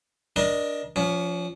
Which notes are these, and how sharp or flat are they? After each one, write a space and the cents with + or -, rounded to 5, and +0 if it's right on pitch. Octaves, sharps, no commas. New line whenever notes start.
D4 +0 A#4 +30 D#5 +0
F3 +0 C#4 +35